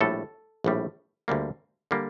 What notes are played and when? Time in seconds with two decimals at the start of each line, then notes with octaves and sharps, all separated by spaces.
0.01 A#1 A2 G3 A4
0.64 A#1 A2 G3
1.28 D2 D3 G3 A#3
1.91 D3 G3 A#3